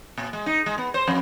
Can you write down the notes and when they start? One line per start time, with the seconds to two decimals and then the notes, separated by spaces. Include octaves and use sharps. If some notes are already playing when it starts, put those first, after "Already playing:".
0.18 A#2
0.33 G#3
0.46 D#4
0.66 G#3
0.78 B3
0.94 C5
1.07 F2